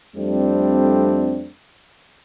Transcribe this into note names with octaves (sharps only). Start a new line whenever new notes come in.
F2 G3 A3 C4 D4